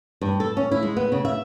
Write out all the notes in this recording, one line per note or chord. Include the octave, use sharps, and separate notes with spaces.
G2
A4
C#4
E4
G#3
B3
C#3
E5